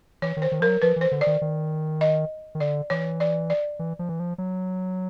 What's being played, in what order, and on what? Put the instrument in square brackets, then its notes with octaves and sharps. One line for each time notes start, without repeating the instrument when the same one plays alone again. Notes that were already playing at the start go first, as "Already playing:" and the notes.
[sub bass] E3 [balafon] C#5
[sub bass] D#3
[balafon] C5
[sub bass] D#3
[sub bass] F3 [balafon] A#4
[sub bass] F#3
[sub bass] F3 [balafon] B4
[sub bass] E3 [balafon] C5
[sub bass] D3
[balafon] D5
[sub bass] D#3
D#3
[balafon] D#5
[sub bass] D#3
[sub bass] D3 [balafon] D5
[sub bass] E3 [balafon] C#5
[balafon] D5
D5
[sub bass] E3
F3
E3
F3
F#3